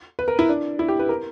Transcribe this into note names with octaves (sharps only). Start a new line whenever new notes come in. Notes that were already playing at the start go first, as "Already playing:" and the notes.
B4
A#4
E4
D4
E4
G4
B4
A#4